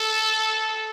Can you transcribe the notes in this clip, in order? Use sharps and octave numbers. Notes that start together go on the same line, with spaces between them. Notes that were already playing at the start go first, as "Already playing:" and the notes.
Already playing: A4